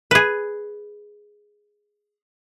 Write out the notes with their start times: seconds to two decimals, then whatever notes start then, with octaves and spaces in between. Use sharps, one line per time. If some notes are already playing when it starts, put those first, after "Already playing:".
0.11 G#4 B4